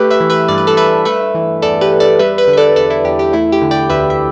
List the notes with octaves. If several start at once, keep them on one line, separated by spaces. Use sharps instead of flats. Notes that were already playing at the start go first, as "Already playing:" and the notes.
Already playing: A3 G4 B4
B4 E5
E3
B4 E5
G2 D5
B4
A4 D5
G2 B4 E5
A3 B4 E5
E3
E2 A4 D5
G4 B4
E2
A4 D5
G3 B4 E5
B4 E5
D3
E5
A4 D5
E2 A4 D5
E4 A4
E2 G4
G4
A3 E4
G4
D3
D5 G5
D2 B4 E5
E5